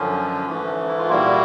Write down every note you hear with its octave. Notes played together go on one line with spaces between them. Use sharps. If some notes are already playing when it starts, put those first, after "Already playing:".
Already playing: F#2 D3 F3 C#4
G#2 E3 A3
E4
F4
A#2 G3 A#3 E4 F#4